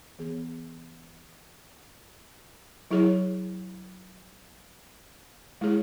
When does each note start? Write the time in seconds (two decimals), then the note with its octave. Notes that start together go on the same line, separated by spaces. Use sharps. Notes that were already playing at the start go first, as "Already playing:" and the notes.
0.19 E3 B3 G#4
2.91 F#3 E4 G#4 C#5
5.61 G#3 E4 G#4 C#5